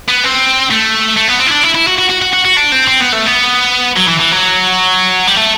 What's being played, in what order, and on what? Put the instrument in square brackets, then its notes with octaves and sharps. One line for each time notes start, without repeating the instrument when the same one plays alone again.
[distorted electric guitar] B3
C4
A3
A3
B3
C4
E4
D4
E4
E4
F#4
F#4
F#4
F#4
F#4
F#4
D4
C4
C4
B3
A3
B3
F#3
E3
E3
F#3
G3
A3